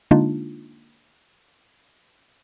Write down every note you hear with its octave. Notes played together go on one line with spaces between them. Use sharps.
D3 G#3 A#3 D4 D#4 F4